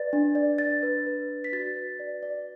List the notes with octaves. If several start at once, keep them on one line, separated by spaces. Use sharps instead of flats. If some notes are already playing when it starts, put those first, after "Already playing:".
Already playing: B4 D5 A6
D4
D5
D5 A6
B4
B4
B4
B6
F#4 A6
B4
D5
D5